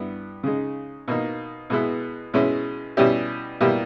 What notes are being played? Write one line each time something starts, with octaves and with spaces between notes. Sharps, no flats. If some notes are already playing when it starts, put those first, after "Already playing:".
Already playing: G2 G3 B3 E4
C#3 G#3 D#4
B2 A#3 D#4
B2 G#3 B3 E4
B2 G#3 C#4 E4
B2 G3 C#4 E4 G4
B2 G3 A#3 E4 G4